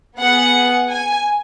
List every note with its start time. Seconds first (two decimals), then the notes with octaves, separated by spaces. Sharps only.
0.18 B3 G#4 F#5
0.90 G#5